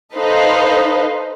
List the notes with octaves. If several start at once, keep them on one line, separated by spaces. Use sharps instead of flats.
D#4 A4 B4 C5 D#5 F5